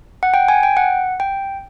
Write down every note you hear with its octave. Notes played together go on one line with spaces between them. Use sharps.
F#5
G5
G#5
G5
F#5
G5